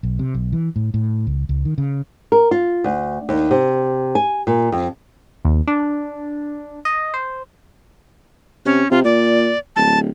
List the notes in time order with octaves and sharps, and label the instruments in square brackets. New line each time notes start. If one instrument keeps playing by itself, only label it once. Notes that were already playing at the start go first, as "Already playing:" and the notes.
[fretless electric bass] B1
C3
B1
E3
A2
A2
C#2
C#2
D#3
C#3
[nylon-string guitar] A#4
F4
D2
D#2
C3
G#5
A#2
F2
[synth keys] D#2
D4
D#5
C5
[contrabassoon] C3 [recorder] C#4
[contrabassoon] C3 [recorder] F4
[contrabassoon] A#2 [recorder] D5
[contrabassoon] D1 [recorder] A5